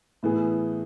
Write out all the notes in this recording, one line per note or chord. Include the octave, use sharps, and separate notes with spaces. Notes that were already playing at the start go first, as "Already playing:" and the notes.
A2 E3 B3 E4 G#4